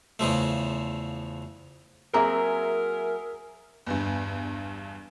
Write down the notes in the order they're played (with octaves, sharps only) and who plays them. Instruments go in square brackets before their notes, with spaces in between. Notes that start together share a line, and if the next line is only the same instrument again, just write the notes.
[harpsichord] E2 C#3 F3 A3
[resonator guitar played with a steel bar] F#3 A#3 C4 [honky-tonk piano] G#4 E5 G#5 [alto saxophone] A#4
[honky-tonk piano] G1 E2 G2